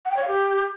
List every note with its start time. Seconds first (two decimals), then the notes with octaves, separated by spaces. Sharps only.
0.05 F#5
0.11 G5
0.16 C#5
0.22 F5
0.28 G4